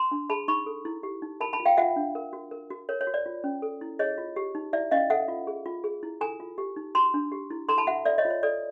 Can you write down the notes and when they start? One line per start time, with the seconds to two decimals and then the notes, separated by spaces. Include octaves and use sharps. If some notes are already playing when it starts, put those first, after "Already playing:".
Already playing: A#5 C6
0.11 D4
0.30 G#4 A5 B5
0.48 D#4 B5 C#6
0.66 A4
0.85 E4
1.03 G4
1.22 D#4
1.40 A#4 A5 B5
1.53 A5 B5
1.60 F4
1.66 F5 G5
1.77 F4 E5 F#5
1.96 D4
2.15 A#4
2.33 F#4
2.51 A#4
2.70 F#4
2.89 A#4 C#5
3.01 C#5
3.07 F#4
3.14 D5
3.26 F4
3.44 C#4
3.62 A4
3.81 E4
3.99 G#4 C#5 D#5
4.18 F4
4.36 G4
4.55 D#4
4.73 E4 D5 E5
4.91 C#4 D#5 F5
5.10 A4 E5 F#5
5.28 F4
5.47 G#4
5.66 F4
5.84 G#4
6.03 E4
6.21 A4 G#5 A#5
6.40 F4
6.58 G4
6.76 D#4
6.95 F#4 A#5 C6
7.14 D4
7.32 G4
7.50 E4
7.69 A4 A#5 C6
7.78 A5 B5
7.87 F#4 E5 F#5
8.05 A4 D5 E5
8.18 C#5 D#5
8.25 F4
8.30 C#5
8.43 A4 D5